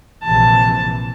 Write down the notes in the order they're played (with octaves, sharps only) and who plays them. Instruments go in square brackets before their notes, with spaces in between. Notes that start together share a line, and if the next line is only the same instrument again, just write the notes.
[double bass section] A#1 C3 E3 [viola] A5